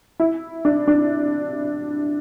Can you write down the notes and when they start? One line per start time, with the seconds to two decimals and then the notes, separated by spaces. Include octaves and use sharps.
0.20 E4
0.65 D4
0.87 D4